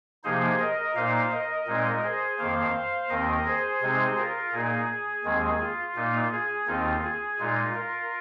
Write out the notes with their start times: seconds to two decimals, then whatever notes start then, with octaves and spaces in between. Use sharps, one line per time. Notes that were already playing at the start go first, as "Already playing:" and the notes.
0.24 C3 F3 A#3 D#4 G#4 C5
0.60 A#4 D#5
0.95 A#2 A#3 D#4 C5 F5
1.31 A#4 D#5
1.67 A#2 G#3 C4 D#4
2.03 G#4 C5
2.38 F2 D#3 A#3 C5 F5
3.09 D#2 D#3 C4 A#4 D#5
3.45 G#4 C5
3.81 C3 G#3 C4 D#4
4.17 F4 A#4
4.52 A#2 A#3 D#4 G#4
5.24 D#2 D#3 G#3 C4
5.60 F4
5.96 A#2 A#3 D#4
6.31 G#4
6.67 D#2 D#3 C4 D#4 F4
7.03 G#4
7.39 A#2 G#3 D#4 F4
7.74 F4 A#4